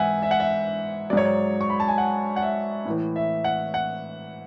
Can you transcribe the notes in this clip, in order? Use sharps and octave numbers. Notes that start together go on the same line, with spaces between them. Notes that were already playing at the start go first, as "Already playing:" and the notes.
Already playing: G#2 E3 E5 F#5 G#5
E5
F#5
E5
G#2 F#3 C#5 D5
D5
C#6
B5
A5
G#5
F#5
F#5
E5
A2 E3
E5
F#5
F#5